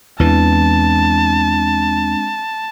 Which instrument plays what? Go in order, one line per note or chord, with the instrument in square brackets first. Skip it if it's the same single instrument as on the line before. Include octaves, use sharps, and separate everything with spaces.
[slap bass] E2 E3 [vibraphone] G#3 C4 D4 [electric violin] A5